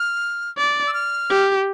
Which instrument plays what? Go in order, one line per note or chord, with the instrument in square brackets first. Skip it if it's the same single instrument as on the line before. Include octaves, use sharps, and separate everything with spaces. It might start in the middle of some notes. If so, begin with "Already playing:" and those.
Already playing: [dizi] F6
[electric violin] D5
[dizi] E6
F6
[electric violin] G4